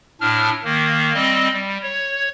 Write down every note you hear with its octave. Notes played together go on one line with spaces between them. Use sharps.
A2 D4 F6
D#3 A#3
G3 C4 D#5
G3
C#5